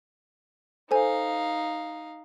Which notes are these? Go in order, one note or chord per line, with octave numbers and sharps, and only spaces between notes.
D#4 A4 C5 F5 G#5